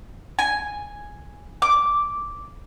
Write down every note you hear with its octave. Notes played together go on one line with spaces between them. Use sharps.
G#5
D6